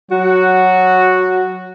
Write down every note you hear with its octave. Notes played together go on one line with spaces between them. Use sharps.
F#3 F#4